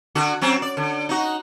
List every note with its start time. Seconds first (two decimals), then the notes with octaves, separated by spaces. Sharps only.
0.15 D3 F#4
0.41 F#3 C4 C#4
0.62 D5
0.77 D3
1.09 D#4 F#4